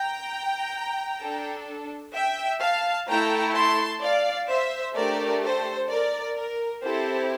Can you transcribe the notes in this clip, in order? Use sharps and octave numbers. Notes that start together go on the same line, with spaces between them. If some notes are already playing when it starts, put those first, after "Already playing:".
Already playing: G5 A#5
D4 A4
E5 G5
F5 A5
A3 E4 A4 G5 A#5
A5 C6
D5 F5
C5 E5
A3 D4 G4 A#4 D5
A4 C5
A#4 D5
A#4
C4 E4 G4 A4 C5